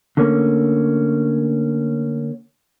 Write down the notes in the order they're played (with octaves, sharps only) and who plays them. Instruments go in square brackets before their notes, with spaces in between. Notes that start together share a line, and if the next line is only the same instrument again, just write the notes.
[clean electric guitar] D3 A3 A#3 C#4